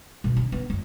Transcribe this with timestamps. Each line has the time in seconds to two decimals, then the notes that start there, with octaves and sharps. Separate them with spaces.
0.24 B2
0.36 C#4
0.52 B3
0.70 F2